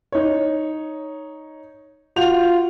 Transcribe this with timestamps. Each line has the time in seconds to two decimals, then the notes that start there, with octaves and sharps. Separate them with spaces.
0.12 D#4 C#5
2.16 F4 F#4 G6 F7